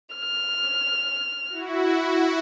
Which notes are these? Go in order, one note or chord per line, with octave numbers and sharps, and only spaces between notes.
F6
E4 F#4